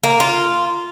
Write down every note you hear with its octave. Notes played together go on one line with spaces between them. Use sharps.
A#3
F4